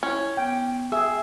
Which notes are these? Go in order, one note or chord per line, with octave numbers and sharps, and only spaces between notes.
C#4 E4
B3 G5
G#4 E5 G5